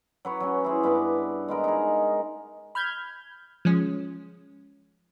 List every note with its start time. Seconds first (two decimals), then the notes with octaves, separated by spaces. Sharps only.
0.25 F#3 B4 C#5
0.40 F#3 C#4
0.64 E4 G#4 C5
0.83 G2 B3 B4 D6
1.48 G#3 B3 A#4
1.64 D#4 G#4
2.75 B5 F6 G6 G#6
3.65 F3 G#3 C#4